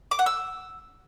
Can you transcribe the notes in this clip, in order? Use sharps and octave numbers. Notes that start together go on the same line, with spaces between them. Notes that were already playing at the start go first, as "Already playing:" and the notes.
D6
F#5
E6